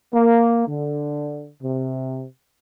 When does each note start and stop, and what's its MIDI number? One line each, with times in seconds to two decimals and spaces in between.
0.13 0.65 58
0.66 1.48 50
1.63 2.23 48